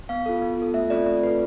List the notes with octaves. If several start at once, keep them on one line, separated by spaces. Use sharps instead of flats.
B3 F5
F4 A4
B3
F4 A4
A3 E5
C4 F4 A4 D5
A3 D5
C4 F4 A4 B4